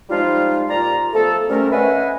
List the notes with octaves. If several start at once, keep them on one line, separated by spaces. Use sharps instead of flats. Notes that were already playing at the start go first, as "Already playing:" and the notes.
F3 G3 G#3 D#4 F4
A#2 G3 F4 D5 A#5
F3 A3 B3 A4
C3 G3 A3 C#4 A4 A#4
C#4 B4 D#5 E5 F#5 G#5